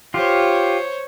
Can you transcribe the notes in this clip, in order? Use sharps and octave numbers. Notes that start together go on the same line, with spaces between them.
F4 G4 C5 C#5